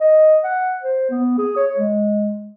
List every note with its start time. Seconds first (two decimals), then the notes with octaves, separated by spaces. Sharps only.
0.01 D#5
0.44 F#5
0.83 C5
1.10 B3
1.38 G#4
1.56 C#5
1.78 G#3